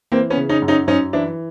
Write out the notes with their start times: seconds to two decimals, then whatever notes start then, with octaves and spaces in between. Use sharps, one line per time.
0.12 E3 A#3 C4
0.30 B3 C#4
0.37 C#3
0.49 C#4 D#4
0.62 F#2
0.68 C#4 D#4
0.88 F#2 C#4 D#4
1.13 E3 D4 E4